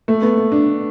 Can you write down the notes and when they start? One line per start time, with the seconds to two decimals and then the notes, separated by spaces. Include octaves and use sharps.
0.08 A3
0.22 B3
0.37 B3
0.52 D4